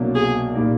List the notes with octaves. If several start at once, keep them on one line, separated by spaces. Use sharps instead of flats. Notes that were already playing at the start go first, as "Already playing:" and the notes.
Already playing: C2 B2 F#3 A#3 D4
G#4
A#2 G3 A#3 D#4